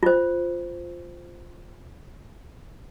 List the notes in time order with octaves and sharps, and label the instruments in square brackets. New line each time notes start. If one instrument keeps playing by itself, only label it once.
[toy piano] F4 C5